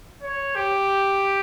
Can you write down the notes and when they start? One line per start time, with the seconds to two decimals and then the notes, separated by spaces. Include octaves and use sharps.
0.23 C#5
0.55 G4